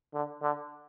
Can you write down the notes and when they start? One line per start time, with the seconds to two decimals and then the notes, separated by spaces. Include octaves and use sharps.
0.14 D3
0.42 D3